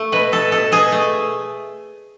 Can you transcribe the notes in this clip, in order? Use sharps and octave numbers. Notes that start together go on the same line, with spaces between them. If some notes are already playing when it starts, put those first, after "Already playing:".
Already playing: A3
B2 B4
B2 A4
B2 A4
B2 G#4
A3